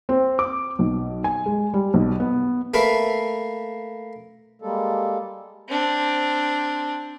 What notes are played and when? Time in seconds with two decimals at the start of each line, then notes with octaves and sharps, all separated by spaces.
0.09 C4
0.39 D6
0.79 B1
1.24 G#5
1.46 G#3
1.74 G3
1.94 B1
2.20 B3
2.74 A3 A#3 B4 F5
4.62 G3 G#3 A#3 A4
5.69 C4 D4